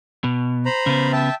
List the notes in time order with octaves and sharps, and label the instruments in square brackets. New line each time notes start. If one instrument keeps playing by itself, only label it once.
[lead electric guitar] B2
[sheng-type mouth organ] C5 A#5 B5
[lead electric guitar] C#3 B3
[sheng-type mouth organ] E5 G5 A5